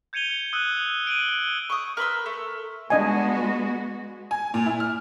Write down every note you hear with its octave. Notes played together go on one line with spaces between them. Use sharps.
G6 G#6 C#7 D#7 F7 G7
D#6 E6 F#6 D#7
D7 D#7 F#7 G7
C#6 D#6
A#4 B4 C6 E6
A3
G#3 B3 D4 F#4 D#5 G#5
G#5
A#2
E4
F6